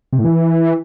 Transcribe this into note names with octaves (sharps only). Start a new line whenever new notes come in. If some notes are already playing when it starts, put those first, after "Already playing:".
C3
A2
E3